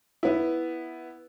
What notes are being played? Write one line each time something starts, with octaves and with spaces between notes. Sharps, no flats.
B3 E4